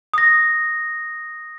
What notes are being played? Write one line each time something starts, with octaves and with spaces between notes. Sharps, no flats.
D#6 A#6